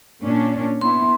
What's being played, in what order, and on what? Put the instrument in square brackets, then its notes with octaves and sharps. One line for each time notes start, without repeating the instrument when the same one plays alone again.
[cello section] A#2 C#4 D4
[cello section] B3 E4 [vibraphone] C6